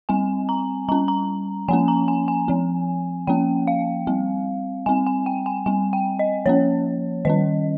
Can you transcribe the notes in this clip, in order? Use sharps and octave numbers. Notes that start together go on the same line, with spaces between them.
G3 C4 G#5
A#5
G3 C#4 A#5
A#5
F3 A#3 C#4 G#5
A#5
G#5
G#5
F3 C4
F3 A#3 C#4 G5
F5
G3 C4
G3 C4 G#5
G#5
G5
G#5
G3 C4 G#5
G5
D#5
F3 A#3 C#4 C#5
D#3 G3 C#4 D#5